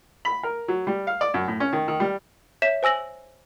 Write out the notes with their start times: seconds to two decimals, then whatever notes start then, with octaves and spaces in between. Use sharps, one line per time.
0.25 B5
0.43 A#4
0.68 F#3
0.87 G3
1.07 F5
1.21 D5
1.34 F#2
1.48 A2
1.60 C#4
1.73 D#3
1.88 D#3
2.00 G3
2.62 C#5 E5 B6 E7
2.83 C5 G#5 E6 A#6 F#7